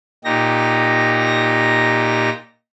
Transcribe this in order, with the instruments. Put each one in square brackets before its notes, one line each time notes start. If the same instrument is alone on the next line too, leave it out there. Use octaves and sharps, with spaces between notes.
[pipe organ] A#2 D#4 G4 A#6